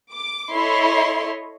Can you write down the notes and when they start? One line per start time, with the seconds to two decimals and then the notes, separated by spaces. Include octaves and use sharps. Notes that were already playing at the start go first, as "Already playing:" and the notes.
0.12 D6
0.53 E4 A4 C#5 D#5 C6